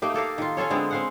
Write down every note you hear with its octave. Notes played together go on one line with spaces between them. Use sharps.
A3 A#3 D#4 G4
A#3 A4 A#4 F5
D#3 F4
C#4 F4 A4 C#5
D3 G#3 B3 C4
C4 F5 F#5